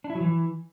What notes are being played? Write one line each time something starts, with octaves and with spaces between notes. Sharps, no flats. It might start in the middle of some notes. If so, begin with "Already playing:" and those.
D4
E4
F#3
E3